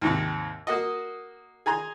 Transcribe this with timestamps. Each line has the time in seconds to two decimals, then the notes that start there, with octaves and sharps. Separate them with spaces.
0.02 D#2 G#2 C3
0.67 A#3 F#4 D#5
1.66 G#4 G#5 A#5 C6